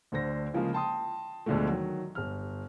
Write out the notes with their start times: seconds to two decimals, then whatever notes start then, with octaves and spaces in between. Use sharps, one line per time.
0.12 D2 D3 C5 A#6
0.54 C#3 F3 G#3 A#3 F4 G#4
0.73 G5 A5 C6 D#6
1.46 D2 B2 D3 F3 G#3 A3
1.69 D#3 F#3
2.15 G1 F6